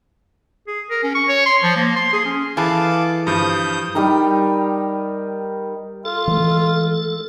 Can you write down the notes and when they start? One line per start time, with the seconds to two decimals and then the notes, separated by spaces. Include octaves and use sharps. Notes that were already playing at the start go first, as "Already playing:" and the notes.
0.67 G#4
0.90 A#4
1.03 C#4
1.15 C#6
1.28 C#5
1.46 C6
1.63 F3
1.77 A#3
1.96 C6
2.13 G#4
2.25 C#4
2.57 E3 G#4 A4 B4 F5 A5 D6
3.27 G2 F3 D#6 G6
3.95 D#3 G3 D#4 A#4
6.05 F4 A4
6.28 E3 G#3 A3